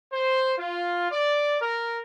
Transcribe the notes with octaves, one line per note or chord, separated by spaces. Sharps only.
C5
F4
D5
A#4